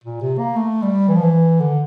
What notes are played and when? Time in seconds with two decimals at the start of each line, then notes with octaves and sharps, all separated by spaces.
0.04 A#2
0.21 C3
0.38 A#3
0.56 A3
0.82 G3
1.08 E3
1.16 F3
1.23 E3
1.61 D3